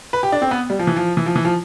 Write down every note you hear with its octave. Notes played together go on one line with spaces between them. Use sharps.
B4
G4
D4
C4
B3
G3
F3
E3
F3
E3
F3
E3
F3